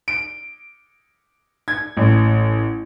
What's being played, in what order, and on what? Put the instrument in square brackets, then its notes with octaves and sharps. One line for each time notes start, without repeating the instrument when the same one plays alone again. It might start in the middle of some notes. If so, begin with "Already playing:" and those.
[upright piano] D7
G#6
A1